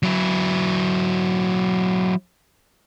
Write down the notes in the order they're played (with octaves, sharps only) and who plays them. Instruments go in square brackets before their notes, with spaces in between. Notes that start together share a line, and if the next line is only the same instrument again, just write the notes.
[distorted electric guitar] F#3 E4